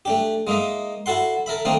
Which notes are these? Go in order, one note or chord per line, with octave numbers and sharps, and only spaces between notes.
A3 D4 G4
G#3 A#3 D#4 D#5 E5
E4 F#4 A4 F#5 C6
A4 A#4 E5 B5
D#3 A3 A#3 C4 D4 D#4